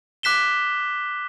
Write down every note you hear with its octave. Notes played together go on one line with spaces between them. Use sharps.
D6 F#6 B6 E7 G7